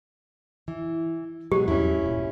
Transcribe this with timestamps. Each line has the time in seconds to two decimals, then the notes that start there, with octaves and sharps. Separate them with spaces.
0.68 E3
1.52 B2 F#3 G#3 G4
1.68 E2 G2 F#3 C#4 E4
2.01 D1 A#2